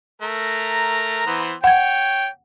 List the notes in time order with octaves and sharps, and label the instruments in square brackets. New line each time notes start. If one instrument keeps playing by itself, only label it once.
[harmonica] A3 A#4 [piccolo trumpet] A#5
[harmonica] E3 B3 C5
[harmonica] C#5 [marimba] F#5 G#6 [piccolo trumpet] G5